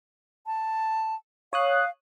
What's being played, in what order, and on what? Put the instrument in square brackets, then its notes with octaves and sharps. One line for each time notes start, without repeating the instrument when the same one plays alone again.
[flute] A5
[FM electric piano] C#5 D#6 F#6 [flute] F5